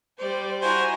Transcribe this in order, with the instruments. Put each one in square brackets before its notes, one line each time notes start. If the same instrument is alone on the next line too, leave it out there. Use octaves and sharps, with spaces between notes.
[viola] G3 C5 [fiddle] D5
[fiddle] E4 A#5 [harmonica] F#4 C5 [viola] G#5